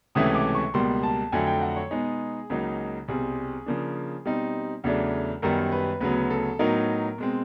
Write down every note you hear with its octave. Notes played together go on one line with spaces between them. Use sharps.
C#2 C3 E3 A3 C#4 D#6
D6
C#6
C#2 B2 G3 A#3 C6
A5
F2 D3 F#3 A3 G#5
G5
F#5
C#5
B2 G#3 B3 D#4 G#4
C#2 C#3 F#3 A#3 D#4
C2 B2 G3 C4 G#4
C#3 F3 A#3 D4
B2 G3 C4 D#4
E2 C#3 F#3 A3 D4
F#2 D#3 G3 B3 A#4
B4
D2 C#3 F#3 B3 B4
A4
A2 F#3 B3 D#4 A#4
B2 G#3 C4